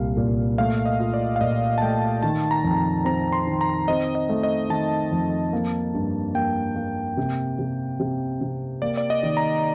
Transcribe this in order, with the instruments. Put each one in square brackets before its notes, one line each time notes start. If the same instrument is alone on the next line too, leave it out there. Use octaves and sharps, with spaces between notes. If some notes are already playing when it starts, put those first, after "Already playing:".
Already playing: [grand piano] C2 A#2 G3 [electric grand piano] F5
[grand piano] A#2
[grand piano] A3 [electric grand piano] F5
[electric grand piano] D#5
[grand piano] F4
[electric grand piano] D5
F5
[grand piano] A#2 [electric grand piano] D#5
[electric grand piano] A5
[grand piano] A3 [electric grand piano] G5
[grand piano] D#3 [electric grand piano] A5
[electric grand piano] A#5
[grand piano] F2
[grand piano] C4 [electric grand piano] A#5
[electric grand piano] C6
[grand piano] D#3
[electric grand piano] A#5
[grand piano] C4 [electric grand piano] D#5
[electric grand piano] D#5
[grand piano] A3
[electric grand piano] D#5
[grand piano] D#3 [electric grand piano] A5
[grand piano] F2
A#3
G2
[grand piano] A#3 [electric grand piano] G5
[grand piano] A#3
C3
C3
C3
C3
[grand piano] A#3 [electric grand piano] D5
[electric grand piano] D5
D#5
[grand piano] D#3
[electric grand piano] A#5